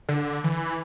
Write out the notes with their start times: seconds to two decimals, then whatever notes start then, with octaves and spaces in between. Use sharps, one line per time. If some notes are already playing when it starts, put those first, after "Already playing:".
0.09 D3
0.44 E3